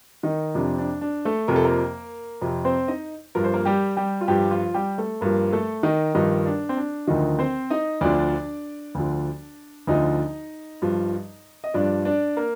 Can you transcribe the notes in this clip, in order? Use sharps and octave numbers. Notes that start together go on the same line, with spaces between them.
D#3 D#4
F2 C3 F3 D4
D4
D4
A3 A4
F2 C3 F3 A#4
A4
A#3 A#4
F2 C3 F3
C4 C5
D#4 D#5
G2 F3 A#4
C5
A#3 A#4
G3 G4
G3 G4
F4
G2 F3 G3 G4
F3 F4
G3 G4
A3 A4
G2 F3 A#3 A#4
A3 A4
D#3 D#4
G2 D#3 F3 D#4
D4
C4
D4
D2 D3 D#3 F3 D#4
C4 C5
D#4 D#5
D2 D3 F3 D4 D5
D2 D3 F3
D2 D3 F3 D#4 D#5
G2 F3
D#5
G2 F3 D4 D5
D4 D5
A#3 A#4